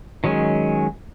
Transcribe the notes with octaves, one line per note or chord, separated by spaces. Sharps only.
D#3 F#3 G#3 C#4